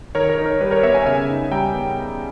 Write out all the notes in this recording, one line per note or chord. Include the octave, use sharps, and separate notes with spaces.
D#3 A#4 C#5
A#4 C#5
D#4
A#4
G3 B4
A#4 C#5
B3 C#5 E5
E5 G#5
C#3 E5 G#5
D#4
G3 G5 A#5
B3